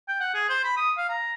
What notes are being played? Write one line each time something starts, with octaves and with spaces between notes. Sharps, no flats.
G5
F#5
G#4
C5
B5
D#6
F5
A#5